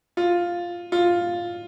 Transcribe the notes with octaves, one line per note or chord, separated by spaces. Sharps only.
F4
F4